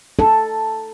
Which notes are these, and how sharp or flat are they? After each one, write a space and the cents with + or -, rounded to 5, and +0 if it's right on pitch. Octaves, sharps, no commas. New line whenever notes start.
D#4 +0 A4 +0